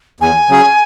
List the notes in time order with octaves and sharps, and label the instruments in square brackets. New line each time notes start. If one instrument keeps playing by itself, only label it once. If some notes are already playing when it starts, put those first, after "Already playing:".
[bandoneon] E2 [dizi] G#5
[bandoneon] C#3 F#3 C#4 G#4